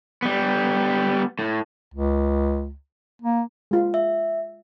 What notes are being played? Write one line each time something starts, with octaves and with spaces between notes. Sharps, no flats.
G3 B3
A2
C#2
A#3
G#3 F4
E5